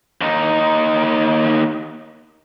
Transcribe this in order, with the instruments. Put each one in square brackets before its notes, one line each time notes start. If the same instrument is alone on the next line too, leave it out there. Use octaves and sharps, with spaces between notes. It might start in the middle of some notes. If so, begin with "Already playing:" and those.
[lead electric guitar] D#2 D#4